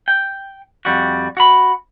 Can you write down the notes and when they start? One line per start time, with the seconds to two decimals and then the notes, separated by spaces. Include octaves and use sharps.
0.08 G5
0.85 F2 G3 F#4
1.37 F#4 B5